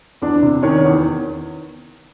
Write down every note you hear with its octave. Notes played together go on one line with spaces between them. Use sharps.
E2 D4 D5
C3
D#3 C#4 C#5
E2